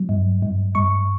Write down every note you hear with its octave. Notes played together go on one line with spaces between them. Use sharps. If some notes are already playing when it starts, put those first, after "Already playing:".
Already playing: F#3
G2
G2
G2 C#6